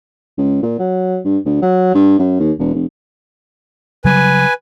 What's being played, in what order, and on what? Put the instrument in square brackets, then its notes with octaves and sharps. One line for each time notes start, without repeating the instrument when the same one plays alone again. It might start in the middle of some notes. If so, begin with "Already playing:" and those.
[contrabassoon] C#2
A#2
F#3
G2
D2
F#3
G2
F#2
D#2
E1
F1
[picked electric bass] C#3 F#3 G3 [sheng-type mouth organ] B4 G#5